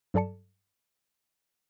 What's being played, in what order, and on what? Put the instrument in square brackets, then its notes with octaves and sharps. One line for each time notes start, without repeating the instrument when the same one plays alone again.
[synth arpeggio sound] G2 F#3 A4 D5 A5 C#7